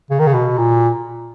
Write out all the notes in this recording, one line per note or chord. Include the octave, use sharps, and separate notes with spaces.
C#3
D#3
C#3
B2
A#2